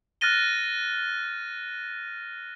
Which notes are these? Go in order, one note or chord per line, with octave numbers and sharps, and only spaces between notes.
F6 F#6 A6 A#6 D#7 G7